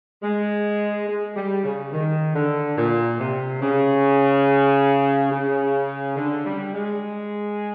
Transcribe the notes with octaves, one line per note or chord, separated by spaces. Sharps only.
G#3
G#3
G3
C#3
D#3
D3
A#2
C3
C#3
C#3
D3
G3
G#3